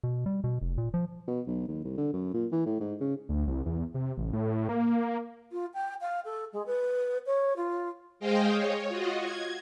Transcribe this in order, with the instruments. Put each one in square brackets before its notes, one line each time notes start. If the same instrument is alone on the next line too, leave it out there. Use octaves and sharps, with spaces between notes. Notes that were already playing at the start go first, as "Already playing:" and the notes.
[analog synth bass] B2
G3
B2
F1
A#2
F3
[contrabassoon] B2
B1
D#2
C2
D3
F#2
A#2
E3
A2
G#2
C#3
[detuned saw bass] D2
C2
E2
C3
A1
A2
A#3
[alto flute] F4
G5
F5
A4
G#3
B4
C#5
F4
[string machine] G#3 G#4 C5 D#5 F5 G5
C#5
F4 F#4 D#5
G#6